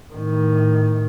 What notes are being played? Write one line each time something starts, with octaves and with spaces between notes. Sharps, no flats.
A2 D#3